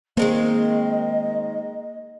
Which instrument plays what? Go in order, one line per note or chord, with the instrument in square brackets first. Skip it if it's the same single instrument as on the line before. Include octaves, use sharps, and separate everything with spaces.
[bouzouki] D#3 G#3 C4 [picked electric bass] A#3 [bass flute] D#5